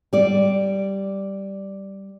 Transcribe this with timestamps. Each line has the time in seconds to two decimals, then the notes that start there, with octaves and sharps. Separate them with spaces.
0.13 G3 D5